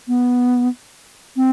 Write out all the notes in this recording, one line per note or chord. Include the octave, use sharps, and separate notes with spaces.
B3
C4